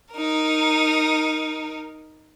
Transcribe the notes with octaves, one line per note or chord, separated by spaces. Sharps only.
D#4 A#4